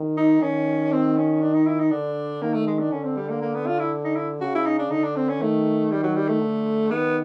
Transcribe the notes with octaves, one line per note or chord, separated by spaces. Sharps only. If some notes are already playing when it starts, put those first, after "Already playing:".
Already playing: D#3
D#4
D#3 C#4
C4
C#4
D4
D#4
E4
D#4
D3 D4
D#3 A#3
A3
G#3
D4
D3 C#4
C4
G3
A#3
A#3
B3
F4
E4
D#4
E4
C#3 F#4
E4
D#4
D4
D3 D#4
D4
C4
C#4
D#3 A3
G3
F#3
G3
A3
D3
D#3 B3